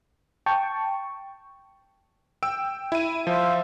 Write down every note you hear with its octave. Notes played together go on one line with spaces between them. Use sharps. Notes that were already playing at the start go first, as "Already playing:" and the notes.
G5 A5 C#6
G5 E6 D7
E4 D#7
F3 C5 E5 F5